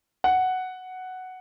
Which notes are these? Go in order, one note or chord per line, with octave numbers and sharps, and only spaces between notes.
F#5